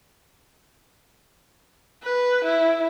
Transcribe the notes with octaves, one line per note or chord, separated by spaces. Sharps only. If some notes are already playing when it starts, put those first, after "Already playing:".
B4
E4